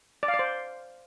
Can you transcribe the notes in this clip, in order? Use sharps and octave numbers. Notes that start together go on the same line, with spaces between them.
D5
F5
D5
C5